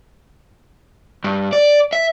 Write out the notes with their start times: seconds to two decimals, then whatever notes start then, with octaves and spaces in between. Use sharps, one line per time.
1.24 G2
1.53 D5
1.93 E5